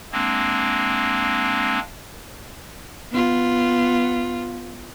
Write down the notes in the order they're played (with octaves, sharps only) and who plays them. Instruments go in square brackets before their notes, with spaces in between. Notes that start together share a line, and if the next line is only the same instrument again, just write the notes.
[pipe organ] G#3 A#3 C4 D4
[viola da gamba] B3 F4